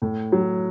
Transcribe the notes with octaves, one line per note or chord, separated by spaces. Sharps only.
A2
F#3